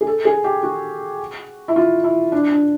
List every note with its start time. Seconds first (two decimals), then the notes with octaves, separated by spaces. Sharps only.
0.01 G#4
0.07 A4
0.25 G#4
0.44 G4
0.63 F#4
1.68 E4
1.76 F4
2.04 E4
2.32 D4
2.51 D4